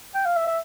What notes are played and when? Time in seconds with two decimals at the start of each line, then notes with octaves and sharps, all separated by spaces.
0.15 G5
0.26 F5
0.36 E5
0.47 E5